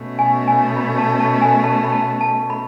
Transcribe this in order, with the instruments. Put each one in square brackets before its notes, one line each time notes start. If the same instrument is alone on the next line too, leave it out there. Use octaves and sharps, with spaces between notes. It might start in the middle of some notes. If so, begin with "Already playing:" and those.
Already playing: [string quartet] B2 A3 C#4
[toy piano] G#5
G#5
B5
A5
A5
G#5
A5
B5
A5
A5
B5